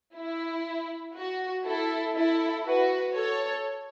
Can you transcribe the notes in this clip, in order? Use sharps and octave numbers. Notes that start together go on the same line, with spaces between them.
E4
F#4
E4 A4
E4 A4
F#4 B4
A4 C#5